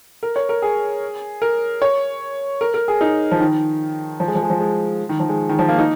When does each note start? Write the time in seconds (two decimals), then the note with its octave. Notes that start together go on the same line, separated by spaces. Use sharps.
0.23 A#4
0.36 C#5
0.49 A#4
0.62 G#4
1.42 A#4
1.82 C#5
2.61 A#4
2.74 A#4
2.88 G#4
3.01 D#4
3.31 F3
3.40 D#3
4.20 F3
4.28 G#3
4.35 F3
4.42 G#3
4.50 F3
4.60 G#3
5.09 D#3
5.20 F3
5.29 G#3
5.49 D#3
5.59 F3
5.69 A#3
5.78 D#4